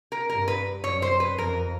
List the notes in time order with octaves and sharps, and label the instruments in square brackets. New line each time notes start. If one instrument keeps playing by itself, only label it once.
[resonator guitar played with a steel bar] A#4
[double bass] G2 [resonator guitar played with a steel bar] A#4
[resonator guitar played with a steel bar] B4
[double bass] F#2 [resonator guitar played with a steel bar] C#5
[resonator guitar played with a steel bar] C5
B4
[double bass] F2 [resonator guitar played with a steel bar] A#4